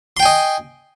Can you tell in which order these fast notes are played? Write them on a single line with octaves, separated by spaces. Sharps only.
C6 G5 G#5 D#5